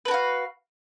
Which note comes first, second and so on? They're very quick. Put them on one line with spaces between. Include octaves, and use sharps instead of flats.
B4 A#4 F#4 F5